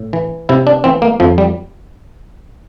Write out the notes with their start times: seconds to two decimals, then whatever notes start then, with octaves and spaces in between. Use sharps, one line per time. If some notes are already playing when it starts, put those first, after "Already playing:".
Already playing: A2
0.13 E3
0.49 C3 E4
0.67 D4
0.84 E3 C4
1.02 A#3
1.20 F2 F3
1.38 G3